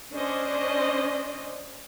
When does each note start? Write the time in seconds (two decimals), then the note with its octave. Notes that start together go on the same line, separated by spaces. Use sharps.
0.14 C#4 D4 C5 D5 D#5